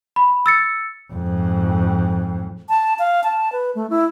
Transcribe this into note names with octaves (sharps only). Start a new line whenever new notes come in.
B5
E6 A6 C#7
F2 G#2
A5
F5
A5
B4
A3
E4